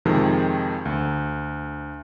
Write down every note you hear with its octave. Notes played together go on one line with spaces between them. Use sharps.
F2 C3 D#3 F3 G#3
D2